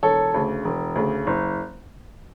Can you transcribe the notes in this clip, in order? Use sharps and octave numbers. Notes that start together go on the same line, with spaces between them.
E1 A4 C#5
D2 C#3
E1
D2 C#3
F#1